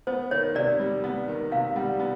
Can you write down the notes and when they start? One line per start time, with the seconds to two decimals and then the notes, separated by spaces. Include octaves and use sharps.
0.07 B3 C5
0.31 D#3 C#5
0.55 C3 D5
0.80 G3
1.04 B3
1.28 D#3
1.51 C3 F5
1.76 G3 F#5
2.00 B3